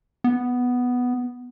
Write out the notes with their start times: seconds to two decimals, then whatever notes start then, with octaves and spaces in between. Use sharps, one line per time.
0.24 B3